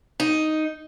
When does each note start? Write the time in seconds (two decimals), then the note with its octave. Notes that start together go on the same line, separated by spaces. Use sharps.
0.20 D#4